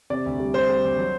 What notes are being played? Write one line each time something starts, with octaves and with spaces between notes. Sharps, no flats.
C3 D5
D2
G3
G3 C5
G3
D2
F#3